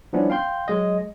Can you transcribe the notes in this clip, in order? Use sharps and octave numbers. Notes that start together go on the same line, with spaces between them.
F3 G3 B3 C#4 D4 E4
F5 G5 C6 G6
F#3 G#3 D#5